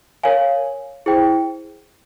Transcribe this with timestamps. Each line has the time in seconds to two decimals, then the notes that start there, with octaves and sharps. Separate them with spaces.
0.23 A#4 C#5 F5 G#5
1.06 E4 G#4 C5 G5